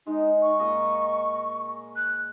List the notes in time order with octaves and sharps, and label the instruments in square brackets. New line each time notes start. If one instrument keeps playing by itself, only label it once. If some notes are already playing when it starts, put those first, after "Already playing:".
[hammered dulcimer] G#3 [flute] D#4
[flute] C#6
[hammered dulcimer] A#2 G#3 D#5
[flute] F#6